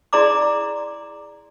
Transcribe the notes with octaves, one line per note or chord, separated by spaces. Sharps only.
E4 G#4 D5 A#5 C6 D6